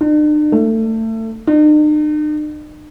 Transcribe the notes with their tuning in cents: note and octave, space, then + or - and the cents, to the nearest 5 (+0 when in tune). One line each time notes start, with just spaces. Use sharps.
D4 +45
A3 +25
D#4 -45